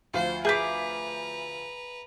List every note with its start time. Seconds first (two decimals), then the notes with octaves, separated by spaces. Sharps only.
0.14 D2 F3 C5 F5
0.45 G#4 B4 E5 A#5 D6 G6 B6